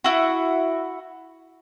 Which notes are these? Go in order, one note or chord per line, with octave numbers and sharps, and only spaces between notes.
E4 F#4